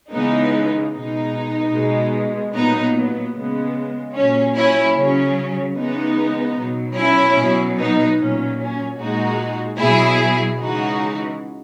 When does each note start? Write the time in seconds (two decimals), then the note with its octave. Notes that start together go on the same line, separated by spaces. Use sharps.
0.13 C#3 E3 G#3 B3 D#4
0.94 B2 G#3 B3 D#4
1.74 B2 G#3
2.55 A#2 F#3 B3 D#4
2.95 B3
3.35 C#3 G#3 B3
4.15 A#2 F#3 C#4
4.56 C#4 E4
4.96 C#3 F#3 C#4
5.77 C#3 E3 G#3 B3 D#4
6.58 B2 F#3
6.97 C#4 E4
7.38 B2 F#3
7.78 B3 D#4
8.18 A#2 F#3 C#4
8.59 C#4
8.98 A#2 G#3 D#4 F#4
9.79 B2 F#3 E4 G#4
10.59 C#3 E3 G#3 D#4 F#4